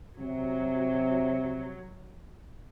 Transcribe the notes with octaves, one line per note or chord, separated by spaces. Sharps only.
C3 F#3